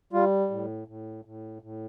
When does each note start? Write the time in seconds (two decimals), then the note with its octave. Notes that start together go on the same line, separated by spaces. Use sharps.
0.13 G3 F4
0.50 A2
0.88 A2
1.25 A2
1.62 A2